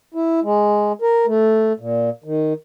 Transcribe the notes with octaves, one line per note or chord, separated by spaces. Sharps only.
E4
G#3
A#4
A3
A#2
D#3